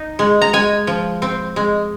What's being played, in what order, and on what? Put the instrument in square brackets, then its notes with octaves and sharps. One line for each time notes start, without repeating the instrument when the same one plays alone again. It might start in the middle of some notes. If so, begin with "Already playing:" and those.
Already playing: [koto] D#4
G#3
A#5
G#3 G#5
F3
C4
G#3